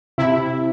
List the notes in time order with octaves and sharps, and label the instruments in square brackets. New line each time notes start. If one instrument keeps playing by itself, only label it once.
[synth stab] C3 E4